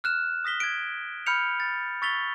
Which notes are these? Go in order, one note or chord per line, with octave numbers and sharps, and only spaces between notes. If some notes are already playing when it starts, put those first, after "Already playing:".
F6 F#6 E7
D#6 A#6 B6 G7
G#6 D7
B5 F6 G6 C#7 F7
A6
C#6 E6 A6 B6 F7 G7